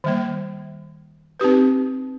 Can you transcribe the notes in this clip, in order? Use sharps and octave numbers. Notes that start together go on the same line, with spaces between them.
D#3 G3 A#3
C4 D#4 G4 B4